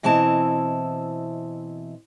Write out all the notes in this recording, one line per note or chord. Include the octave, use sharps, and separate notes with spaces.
B2 E3 C4 E4 D#5 A5